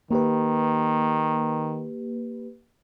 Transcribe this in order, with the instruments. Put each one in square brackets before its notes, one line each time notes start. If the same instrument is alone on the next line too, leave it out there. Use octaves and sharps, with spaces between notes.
[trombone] D#3 [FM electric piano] A#3 G4 B4